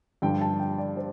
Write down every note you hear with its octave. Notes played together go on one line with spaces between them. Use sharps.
G2 D3 F3 G5
A5
G5
D5
C5